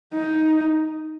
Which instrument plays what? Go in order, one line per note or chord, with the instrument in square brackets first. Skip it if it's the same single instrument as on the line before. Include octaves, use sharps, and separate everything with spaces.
[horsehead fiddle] D#4